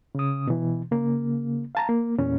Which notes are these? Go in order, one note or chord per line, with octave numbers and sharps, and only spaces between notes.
C#3 D#6
B2 E3
C#3 A#3
F5 A5 A#5
A#3
E2 A#2 C#4